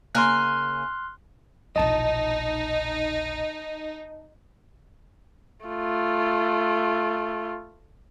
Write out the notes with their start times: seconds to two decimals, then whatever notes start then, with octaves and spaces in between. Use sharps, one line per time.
0.15 C#3 A#3 G#5 C6 F6 F#6
1.76 E1 A#1 D#4 D#5 A5
5.66 A3 F4